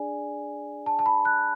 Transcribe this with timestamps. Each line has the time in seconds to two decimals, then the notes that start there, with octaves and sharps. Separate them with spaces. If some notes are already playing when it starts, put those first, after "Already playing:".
Already playing: D4 G#4 D5 G#5
0.86 A5
0.99 A5
1.06 B5
1.25 F#6